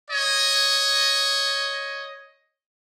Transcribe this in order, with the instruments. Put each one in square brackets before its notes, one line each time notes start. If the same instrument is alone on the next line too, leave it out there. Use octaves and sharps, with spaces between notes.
[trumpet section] C#5 D#5